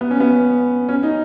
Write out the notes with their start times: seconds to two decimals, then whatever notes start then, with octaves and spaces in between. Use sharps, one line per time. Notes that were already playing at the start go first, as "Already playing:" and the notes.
0.01 B3
0.11 C#4
0.20 B3
0.89 C#4
1.03 D#4